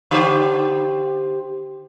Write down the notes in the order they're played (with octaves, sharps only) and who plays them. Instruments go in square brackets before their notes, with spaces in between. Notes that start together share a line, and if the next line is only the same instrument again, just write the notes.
[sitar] D3 G4 C5